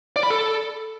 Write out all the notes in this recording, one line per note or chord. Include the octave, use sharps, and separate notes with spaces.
D5
B5
A4